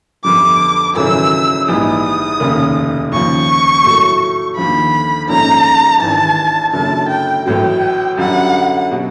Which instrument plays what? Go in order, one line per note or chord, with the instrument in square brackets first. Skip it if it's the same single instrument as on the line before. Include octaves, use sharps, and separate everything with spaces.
[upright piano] G1 F2 D3 G3 [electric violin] D6
[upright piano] G#1 F#2 C#3 E3 A3 [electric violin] E6
[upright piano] A#1 G#2 E3 G3 [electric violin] D#6
[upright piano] F1 D#2 C#3
[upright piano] D#2 C#3 F3 [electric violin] C#6
[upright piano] A2 F#3 A3
[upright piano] D#2 D3 F3 [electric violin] B5
[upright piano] A#1 G#2 F3 A3 C#4 [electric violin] A#5
[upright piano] G#1 G2 E3 [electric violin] A5
[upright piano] F#1 F#2 D3 [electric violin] A5
[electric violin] G5
[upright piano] A1 A2 F#3 [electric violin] G5
[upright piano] F#2 D3 G3 [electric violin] F#5
[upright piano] B2 F#3